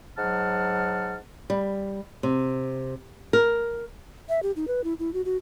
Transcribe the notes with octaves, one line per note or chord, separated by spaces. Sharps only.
G#2 F#3 F#5 A5 F6
G3
C3
A#4
E5
G4
D#4
B4
E4
E4
F#4
F#4